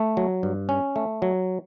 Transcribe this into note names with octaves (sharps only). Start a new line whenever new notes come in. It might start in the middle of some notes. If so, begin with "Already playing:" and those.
Already playing: A3
F#3
G2
C#4
A3
F#3